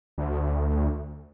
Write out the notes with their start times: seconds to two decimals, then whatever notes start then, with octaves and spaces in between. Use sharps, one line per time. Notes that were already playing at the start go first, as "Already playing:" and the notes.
0.18 D2